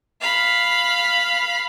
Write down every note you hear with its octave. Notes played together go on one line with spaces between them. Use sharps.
F5 B5